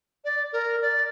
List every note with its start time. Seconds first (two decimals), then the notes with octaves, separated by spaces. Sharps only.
0.25 D5
0.53 A#4
0.82 D5